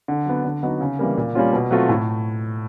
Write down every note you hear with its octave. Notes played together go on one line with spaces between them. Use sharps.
D3
F#3 B3
D3
F#3 B3 D#4
C#3
E3 G3 A#3
A#2
G3 A#3 C#4 F4
B2
F#3 A3 C4 F4
A2